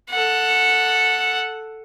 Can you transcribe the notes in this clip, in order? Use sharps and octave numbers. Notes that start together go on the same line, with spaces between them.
A4 F#5